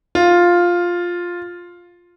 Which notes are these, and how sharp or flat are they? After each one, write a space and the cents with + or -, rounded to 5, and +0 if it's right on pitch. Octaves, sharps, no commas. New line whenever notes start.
F4 +5